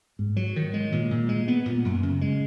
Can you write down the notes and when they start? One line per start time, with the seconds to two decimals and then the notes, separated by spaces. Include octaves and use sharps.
0.19 G#2
0.36 F#3
0.56 D#3
0.73 G#3
0.92 A#2
1.11 A#2
1.29 G#3
1.48 B3
1.66 A#2
1.85 F#2
2.03 C#3
2.21 G#3